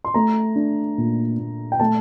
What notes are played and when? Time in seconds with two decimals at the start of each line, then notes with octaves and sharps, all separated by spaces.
0.05 C6
0.14 A3 A#5
0.56 D4
0.98 A#2
1.39 A#2
1.72 G5
1.80 A3 A5